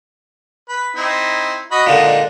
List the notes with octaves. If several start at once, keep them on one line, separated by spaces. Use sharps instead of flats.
B4
C4 D#4 E4
F#4 D#5 B5
A#2 D3 G#3 D4 D#4